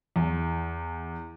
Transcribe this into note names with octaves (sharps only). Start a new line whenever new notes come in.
E2